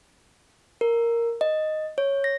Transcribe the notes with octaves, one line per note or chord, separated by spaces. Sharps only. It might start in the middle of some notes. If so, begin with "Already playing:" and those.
A#4
D#5
C#5
A#6